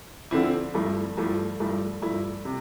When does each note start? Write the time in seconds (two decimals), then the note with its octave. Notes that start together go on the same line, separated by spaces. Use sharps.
0.31 D3 F3 C4 E4
0.74 G2 F3 A3 E4
1.17 G2 F3 A3 E4
1.60 G2 F3 A3 E4
2.02 G2 F3 A3 E4
2.45 C3